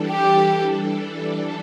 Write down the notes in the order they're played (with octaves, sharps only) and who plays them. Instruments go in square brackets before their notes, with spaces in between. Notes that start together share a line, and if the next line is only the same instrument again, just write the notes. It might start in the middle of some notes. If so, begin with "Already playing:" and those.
Already playing: [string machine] E3 G3 D4 A4
[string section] G4